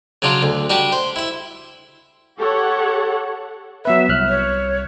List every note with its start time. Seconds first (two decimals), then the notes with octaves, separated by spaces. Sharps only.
0.22 C#3 F#3 D4 F4
0.43 D2
0.70 G3 D4 F#4 G4
0.92 C5
1.16 E4 E5
2.37 G4 A4 C#5 F#5
3.85 F#3 B3 B4 E5
4.09 C2 F6 F#6
4.28 C#5